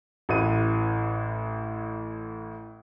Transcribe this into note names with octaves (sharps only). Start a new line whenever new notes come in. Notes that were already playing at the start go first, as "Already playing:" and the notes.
A1 A2 B4 D#7